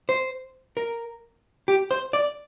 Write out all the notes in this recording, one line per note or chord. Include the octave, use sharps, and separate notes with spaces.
C5
A#4
G4
C5
D5